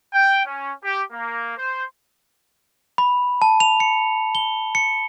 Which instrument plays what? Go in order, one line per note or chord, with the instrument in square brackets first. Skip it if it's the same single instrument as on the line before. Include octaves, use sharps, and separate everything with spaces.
[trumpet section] G5
C#4
G4
A#3
C5
[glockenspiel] B5
A5
F7
C#7
G7
C#7